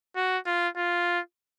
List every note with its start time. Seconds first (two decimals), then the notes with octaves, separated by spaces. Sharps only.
0.16 F#4
0.46 F4
0.77 F4